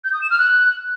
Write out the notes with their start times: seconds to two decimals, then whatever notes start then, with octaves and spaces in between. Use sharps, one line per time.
0.04 G6
0.13 D#6
0.22 E7
0.30 F6
0.39 F#6